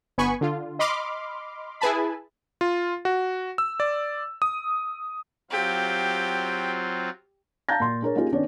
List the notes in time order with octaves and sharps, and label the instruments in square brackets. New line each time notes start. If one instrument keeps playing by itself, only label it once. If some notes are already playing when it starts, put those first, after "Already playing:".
[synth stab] G1 B3 G#5 B5 C#6
D3 F4
D#5 B5 C6 D6 F6
E4 G#4 B4 G#5 A5 B5
[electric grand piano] F4
F#4
E6
D5
D#6
[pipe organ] F#3 C4 F4 [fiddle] G4
[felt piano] F5 A5 A#5 G6 A6 A#6
A#2 C6
D4 G#4 A#4 C#5
A#3 C#4 D#4 F4 G4 G#4
D#3 B3 C#4 D4 C#5 D5